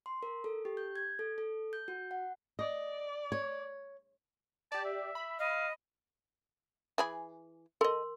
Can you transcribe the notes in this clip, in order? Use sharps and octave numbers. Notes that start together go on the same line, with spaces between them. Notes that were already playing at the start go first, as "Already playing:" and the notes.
C6
A#4
A4
G4
G6
G#6
A4
A4
G6
F#4
F#5
D5 D#5
C#5
G4 D5 A5
E5
B5
D#5 F5
E3 G#4 B5
A4 A#4 D#5 C6